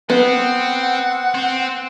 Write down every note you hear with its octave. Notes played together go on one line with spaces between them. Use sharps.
B3 C4 F#5
C4